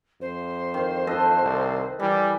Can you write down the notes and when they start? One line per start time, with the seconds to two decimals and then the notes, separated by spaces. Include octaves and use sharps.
0.21 F2 C5
0.74 D#3
1.07 A4 B4 D#5
1.42 C2
2.00 E3 G3